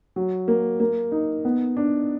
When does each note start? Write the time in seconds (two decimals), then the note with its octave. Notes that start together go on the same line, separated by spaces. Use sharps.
0.16 F#3
0.48 A#3
0.80 A#3
1.12 D#4
1.45 B3
1.77 D4